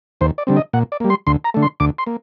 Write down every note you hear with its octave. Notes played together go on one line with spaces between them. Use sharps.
D#2 C5
D5
D3 G3 C4
D#5
A#2 F#5
D5
G3 A#3
C6
D2 C6
A#5
D3 A3
C6
D2 D6
C6
A#3